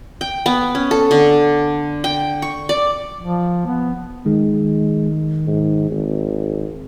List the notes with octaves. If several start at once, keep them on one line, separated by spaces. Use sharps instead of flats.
G5
B3
C#4
A4
D3
G5
C#6
D5
F3
B3
D#3 G#3
G#2
G#1